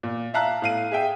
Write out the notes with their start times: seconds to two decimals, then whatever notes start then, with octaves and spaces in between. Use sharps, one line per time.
0.03 A#2
0.34 E5 F5 A5 A#5 F#6
0.62 A2 F5 D#7
0.91 G#4 E5 G5